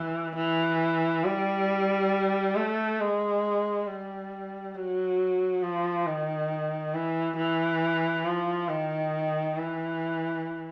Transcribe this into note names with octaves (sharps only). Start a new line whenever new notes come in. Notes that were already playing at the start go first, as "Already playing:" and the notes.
Already playing: E3
E3
G3
A3
G#3
G3
F#3
F3
D#3
E3
E3
F3
D#3
E3